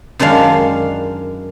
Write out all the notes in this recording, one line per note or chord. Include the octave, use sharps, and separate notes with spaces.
F#2 D#3 G#3 D4 F5